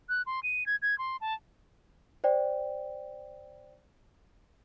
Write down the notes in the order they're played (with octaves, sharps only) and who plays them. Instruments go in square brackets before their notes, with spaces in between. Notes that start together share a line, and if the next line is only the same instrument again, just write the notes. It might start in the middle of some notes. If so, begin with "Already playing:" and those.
[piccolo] F#6
C6
D#7
G#6
G#6
C6
A5
[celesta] C5 D5 G5